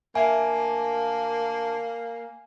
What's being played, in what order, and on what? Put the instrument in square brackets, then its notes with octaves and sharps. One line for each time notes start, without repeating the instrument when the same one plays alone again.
[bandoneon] D2 D4 A#4 [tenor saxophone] A#3 [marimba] E5 [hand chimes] G#5